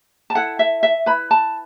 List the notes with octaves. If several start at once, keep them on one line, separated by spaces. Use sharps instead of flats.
A5
E4 A4 F#5
E5
E5
E4 B4 B5
A5